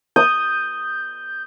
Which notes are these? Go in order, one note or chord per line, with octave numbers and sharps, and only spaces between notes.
D#6 G6